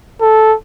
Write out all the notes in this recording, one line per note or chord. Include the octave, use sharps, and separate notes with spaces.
A4